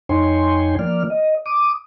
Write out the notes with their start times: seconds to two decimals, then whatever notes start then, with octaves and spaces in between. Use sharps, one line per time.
0.09 F2 D#4 C#5 G5 G#5 C6
0.79 F3 A#3 D5 F6
1.10 D#5
1.46 D6 D#6